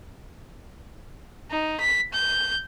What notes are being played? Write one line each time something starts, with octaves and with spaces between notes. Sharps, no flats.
D#4
B6
G6